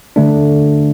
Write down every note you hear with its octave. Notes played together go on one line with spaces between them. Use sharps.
D3 A3 D4